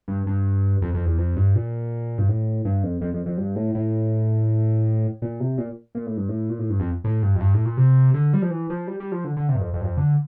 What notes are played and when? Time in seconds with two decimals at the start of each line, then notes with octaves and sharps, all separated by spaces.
0.08 G2
0.27 G2
0.82 F2
0.94 F2
1.05 E2
1.18 F2
1.36 G2
1.55 A#2
2.18 G2
2.29 A2
2.65 G2
2.84 F2
3.01 F2
3.14 F2
3.26 F2
3.38 G2
3.56 A2
3.75 A2
5.22 A#2
5.40 C3
5.58 A#2
5.95 A#2
6.06 A2
6.17 G2
6.29 A2
6.49 A#2
6.59 A2
6.70 G2
6.80 F2
7.04 A2
7.23 G2
7.35 F2
7.41 G2
7.54 A2
7.65 A#2
7.77 C3
8.14 D3
8.34 G3
8.42 F3
8.51 E3
8.70 F3
8.88 G3
9.00 G3
9.12 F3
9.24 D3
9.37 D3
9.49 C3
9.55 G2
9.61 F2
9.74 F2
9.81 G2
9.85 F2
9.97 D3